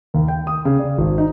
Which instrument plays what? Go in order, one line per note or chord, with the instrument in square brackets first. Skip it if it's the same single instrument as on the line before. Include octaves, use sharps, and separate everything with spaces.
[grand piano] D#2
G5
D#6
C#3
D5
G#1
D#4